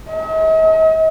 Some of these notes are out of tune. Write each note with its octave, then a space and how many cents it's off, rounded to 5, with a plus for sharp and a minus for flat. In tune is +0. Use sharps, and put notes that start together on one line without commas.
D#5 +45